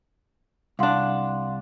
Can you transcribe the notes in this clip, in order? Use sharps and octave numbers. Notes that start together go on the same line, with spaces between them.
C2 D4 F5 F#5 C6